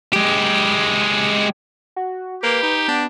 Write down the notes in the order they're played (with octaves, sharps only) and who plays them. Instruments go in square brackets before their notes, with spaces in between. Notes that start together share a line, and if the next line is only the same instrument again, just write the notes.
[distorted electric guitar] G#3 G4
[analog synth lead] F#4
[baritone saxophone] A#3 [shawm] G4 [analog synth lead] B4
[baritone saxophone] D#4
[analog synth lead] B3 [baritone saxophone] D4